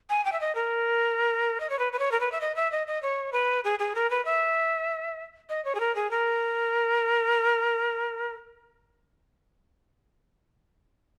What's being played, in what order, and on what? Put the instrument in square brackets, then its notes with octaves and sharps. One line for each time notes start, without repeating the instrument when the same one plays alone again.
[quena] G#5
G5
E5
D#5
A#4
D#5
C#5
B4
B4
C#5
A#4
B4
E5
D#5
E5
D#5
D#5
C#5
B4
G#4
G#4
A#4
B4
E5
D#5
C#5
G#4
A#4
G#4
A#4